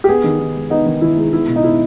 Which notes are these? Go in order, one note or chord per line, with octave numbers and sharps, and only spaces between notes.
G4
B3 G#4
D#3
D#3
G#3
B3 D#4
D#3
D#3 E4
G#3
B3 E4
B2
D#4
B2 E4